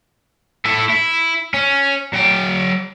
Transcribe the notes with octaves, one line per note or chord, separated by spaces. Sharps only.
A3 E4
E4
C#4
F#3 G5